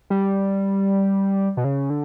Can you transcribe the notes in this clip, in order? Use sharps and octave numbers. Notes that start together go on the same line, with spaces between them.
G3
B2
C#3
D3